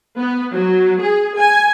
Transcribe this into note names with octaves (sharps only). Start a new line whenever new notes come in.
B3
F#3
G#4
G#5